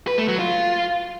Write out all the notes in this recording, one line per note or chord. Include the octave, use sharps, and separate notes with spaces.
B4
A3
F#3
F4